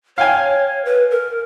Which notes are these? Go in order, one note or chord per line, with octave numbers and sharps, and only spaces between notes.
C#5 F5 G5 G#5
B4
A#4